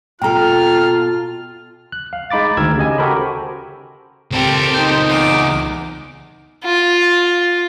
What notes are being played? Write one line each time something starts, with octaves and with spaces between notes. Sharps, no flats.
B2 F4 A4 G5 A#5 F6
F#6
F5
G#3 D#4 B5 D6 A6
D2 D#3 A#4 E6 G#6
C#3 G4 D#5 G#5
F#4 G4 A4 A#4 C5 B5
C#2 C4 G4 A4 A#4
D#4 C5
E2 D6
F4